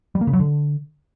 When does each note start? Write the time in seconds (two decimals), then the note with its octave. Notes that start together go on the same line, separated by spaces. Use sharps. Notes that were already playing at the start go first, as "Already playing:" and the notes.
0.15 G3
0.21 A#3
0.27 C#3
0.33 F#3
0.39 D3